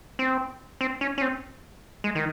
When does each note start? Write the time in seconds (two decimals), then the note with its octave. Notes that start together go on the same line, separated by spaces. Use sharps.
0.19 C4
0.81 C4
1.01 C#4
1.18 C#4
1.22 C4
2.04 G#3
2.15 D#3